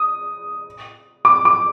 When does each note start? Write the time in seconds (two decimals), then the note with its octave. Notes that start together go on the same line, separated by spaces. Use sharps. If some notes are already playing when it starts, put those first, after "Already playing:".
Already playing: D#6
1.25 D6
1.45 D6